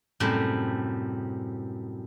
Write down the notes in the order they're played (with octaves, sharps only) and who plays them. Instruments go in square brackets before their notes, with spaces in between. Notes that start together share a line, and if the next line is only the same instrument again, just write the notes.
[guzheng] F#2 A2 C3 G3